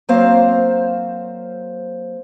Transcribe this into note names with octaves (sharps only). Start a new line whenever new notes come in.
F#3 A#3 C4 C5 F5